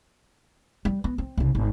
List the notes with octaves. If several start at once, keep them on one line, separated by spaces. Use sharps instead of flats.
G3
B3
C4
C2 C#3
G#1